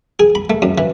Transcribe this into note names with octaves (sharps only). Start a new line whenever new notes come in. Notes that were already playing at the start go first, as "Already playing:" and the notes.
G#4
B5
A3
F#2
E3